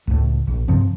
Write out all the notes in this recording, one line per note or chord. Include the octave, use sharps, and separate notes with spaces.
C#2 A2
A#1
G2 C3 F3 C4